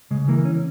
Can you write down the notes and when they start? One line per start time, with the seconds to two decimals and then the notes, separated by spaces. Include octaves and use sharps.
0.11 C#3 G#3
0.28 E3 A#3
0.45 C#4